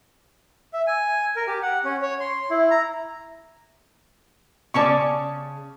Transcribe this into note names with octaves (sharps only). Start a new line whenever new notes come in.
E5
G#5
A#4
G4
F#5
C#4
C#5
C6
E4
A#5
C#3 C#4 D5 A5 C#6